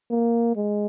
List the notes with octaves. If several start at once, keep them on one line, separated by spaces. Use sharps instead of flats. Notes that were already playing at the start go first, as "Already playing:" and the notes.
A#3
G#3